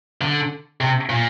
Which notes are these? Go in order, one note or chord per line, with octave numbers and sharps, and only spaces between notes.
D3
C3
A#2